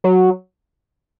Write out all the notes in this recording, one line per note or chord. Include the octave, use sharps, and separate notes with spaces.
F#3